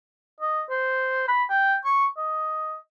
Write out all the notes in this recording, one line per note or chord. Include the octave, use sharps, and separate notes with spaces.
D#5
C5
B5
G5
C#6
D#5